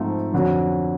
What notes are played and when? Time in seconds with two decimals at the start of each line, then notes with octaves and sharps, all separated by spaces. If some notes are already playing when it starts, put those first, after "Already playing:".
Already playing: G#2 F3 A3 C4 D#4
0.33 F2 D3 F#3